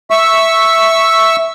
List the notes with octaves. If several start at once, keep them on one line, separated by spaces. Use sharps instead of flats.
E5 C#6 E6